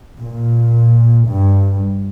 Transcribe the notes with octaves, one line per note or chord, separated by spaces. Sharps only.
A#2
G2